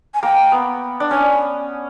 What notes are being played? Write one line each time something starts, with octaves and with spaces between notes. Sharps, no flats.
G#5
A#3 G5
B3
D4
C#4 G#5